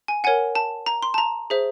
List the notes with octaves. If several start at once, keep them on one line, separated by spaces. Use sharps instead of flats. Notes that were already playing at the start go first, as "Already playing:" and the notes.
G#5
A#4 C#5 F#5 G#5
A5
A#5
C6
A5
A#5
G#4 C5 E5